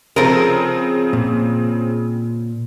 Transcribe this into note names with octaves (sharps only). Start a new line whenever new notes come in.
C#3 F3 C4 A#4
A#2